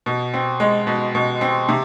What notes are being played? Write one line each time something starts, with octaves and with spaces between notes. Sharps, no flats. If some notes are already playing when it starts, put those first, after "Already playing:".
B2
C4
G#3
B2
B2
C4
C3